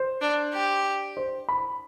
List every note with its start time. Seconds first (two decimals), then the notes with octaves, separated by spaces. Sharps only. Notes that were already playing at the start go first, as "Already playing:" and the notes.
Already playing: C5
0.21 D4
0.53 G4
1.17 C5
1.49 B5